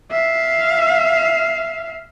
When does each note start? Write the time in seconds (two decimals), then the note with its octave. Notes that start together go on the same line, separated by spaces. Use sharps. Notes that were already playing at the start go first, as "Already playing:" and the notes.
0.11 E5 F5